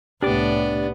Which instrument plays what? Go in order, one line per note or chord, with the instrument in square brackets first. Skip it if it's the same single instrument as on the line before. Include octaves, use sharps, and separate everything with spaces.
[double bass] C2 A2 [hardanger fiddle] B3 [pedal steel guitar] D4 D5 [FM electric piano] G4